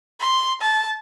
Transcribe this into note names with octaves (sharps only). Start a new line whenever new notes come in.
C6
A5